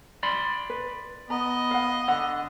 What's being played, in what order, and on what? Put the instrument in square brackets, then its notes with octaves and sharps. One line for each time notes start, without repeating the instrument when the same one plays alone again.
[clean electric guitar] D5 B5 C6
[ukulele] B4
[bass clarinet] B3 [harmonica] D#5 [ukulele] A#5
[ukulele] F5 F#5
[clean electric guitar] D3 [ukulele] F#5